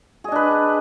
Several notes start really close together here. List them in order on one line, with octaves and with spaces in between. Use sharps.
G#4 D#5 D4 B4